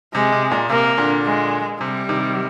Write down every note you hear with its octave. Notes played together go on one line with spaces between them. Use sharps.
C3 G#3
C3
A#2
C3 A#3
A#2 D3
G#3
C3 G3
C3 D#3